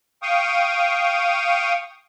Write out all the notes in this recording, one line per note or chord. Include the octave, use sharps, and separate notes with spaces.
F5 G5 C#6 D#6